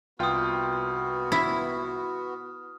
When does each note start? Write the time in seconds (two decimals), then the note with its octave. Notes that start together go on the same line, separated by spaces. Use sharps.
0.19 C2 B3 F4 F#4 G5 D#6 F6
1.32 E4